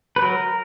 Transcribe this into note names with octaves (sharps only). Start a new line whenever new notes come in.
B4
F#3 A#4